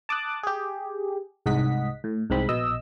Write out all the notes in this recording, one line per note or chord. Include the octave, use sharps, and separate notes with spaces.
A5 D6 D#6 F#6
G4 G#4
C2 G#2 D#5 F#5 B6
A2
C2 G#2 G#3 C4 B5
A#1 B2 D#5 E6